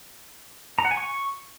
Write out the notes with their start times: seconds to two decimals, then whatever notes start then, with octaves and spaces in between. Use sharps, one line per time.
0.79 A#5
0.85 F#5
0.91 G#5
0.97 C#6